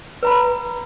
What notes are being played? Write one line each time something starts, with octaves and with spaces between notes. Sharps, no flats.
B4 A#5 B5